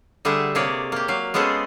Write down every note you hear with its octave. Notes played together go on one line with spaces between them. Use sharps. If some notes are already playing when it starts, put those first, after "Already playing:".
D3 G3 A3 G#4 E5 F#5
C3 A#3 G#4 C#5 D5
A#3 G4
F#3 F5
G#3 B3 C#4 G#4 A4 C5